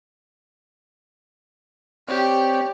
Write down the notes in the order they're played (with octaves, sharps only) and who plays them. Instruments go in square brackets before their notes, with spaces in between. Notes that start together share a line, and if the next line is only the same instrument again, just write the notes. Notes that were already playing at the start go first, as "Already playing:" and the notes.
[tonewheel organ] C4 C#5 D5 [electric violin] G4